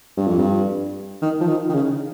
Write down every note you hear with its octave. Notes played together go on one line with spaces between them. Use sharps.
G2
F2
G2
D#3
F3
D#3
D#3
C#3